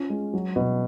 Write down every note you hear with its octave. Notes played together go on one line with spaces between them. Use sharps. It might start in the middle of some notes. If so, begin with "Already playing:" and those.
Already playing: C#4 F4
G#3
F#3
B2